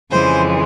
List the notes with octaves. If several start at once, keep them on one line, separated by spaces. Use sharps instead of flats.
F2 C#3 E3 G#3 C5